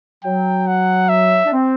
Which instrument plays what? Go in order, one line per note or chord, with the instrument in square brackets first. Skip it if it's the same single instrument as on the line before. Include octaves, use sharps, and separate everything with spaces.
[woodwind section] F#3 [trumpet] G5
[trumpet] F#5
E5
[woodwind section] D4
C4